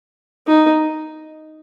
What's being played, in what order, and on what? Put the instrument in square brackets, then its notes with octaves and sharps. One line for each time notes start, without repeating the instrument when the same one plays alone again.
[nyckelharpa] D#4